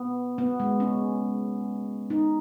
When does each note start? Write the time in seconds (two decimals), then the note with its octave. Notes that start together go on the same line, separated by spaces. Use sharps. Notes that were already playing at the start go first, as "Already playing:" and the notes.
Already playing: B3
0.38 B3
0.60 G#3
0.80 C#4
2.10 D#4